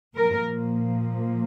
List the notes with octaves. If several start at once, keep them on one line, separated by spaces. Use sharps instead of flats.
A#2 F3 A#3 A#4